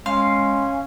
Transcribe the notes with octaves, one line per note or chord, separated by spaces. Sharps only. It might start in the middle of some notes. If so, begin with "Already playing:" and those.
G#3 C#4 F5 C6